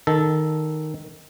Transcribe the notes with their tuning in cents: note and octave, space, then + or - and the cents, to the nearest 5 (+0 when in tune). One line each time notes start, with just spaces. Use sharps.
D#3 +0 A4 -5